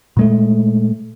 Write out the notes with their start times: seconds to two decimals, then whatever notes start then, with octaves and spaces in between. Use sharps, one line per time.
0.17 A#2 G#3 A3